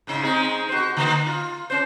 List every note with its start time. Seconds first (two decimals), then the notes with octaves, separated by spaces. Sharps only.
0.07 G#2 C#3 D#4
0.23 G#3 C4 D#4
0.69 F#4 C5
0.97 D3 A#3 D#4
1.27 F4
1.70 C#4 C5